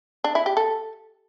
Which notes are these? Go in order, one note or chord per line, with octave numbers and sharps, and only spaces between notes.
D4
E4
G4
A4